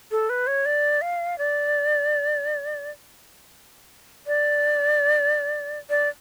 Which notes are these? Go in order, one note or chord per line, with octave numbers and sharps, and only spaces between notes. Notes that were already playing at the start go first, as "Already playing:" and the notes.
A4
B4
C#5
D5
F5
D5
D5
D5